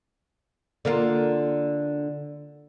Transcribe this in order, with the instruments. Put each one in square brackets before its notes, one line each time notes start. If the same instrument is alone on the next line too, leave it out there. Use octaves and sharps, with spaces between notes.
[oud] D3 A#3 F4